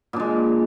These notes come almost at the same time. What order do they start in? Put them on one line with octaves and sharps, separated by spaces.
A#2 D4 G#3